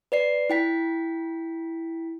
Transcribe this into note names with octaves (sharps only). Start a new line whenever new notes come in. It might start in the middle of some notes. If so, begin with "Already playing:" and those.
B4 D5 C7
E4 G5 B6